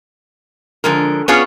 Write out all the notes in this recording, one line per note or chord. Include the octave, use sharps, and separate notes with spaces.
D3 F3 G#3 A#4
B3 C#4 D4 F4 G#4 C#5